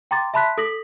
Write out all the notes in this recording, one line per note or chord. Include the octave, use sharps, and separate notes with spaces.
G5 A#5 C6 D6 A6
E5 A5 B5 C6 F#6 B6
A4 D#6 A#6 B6 F#7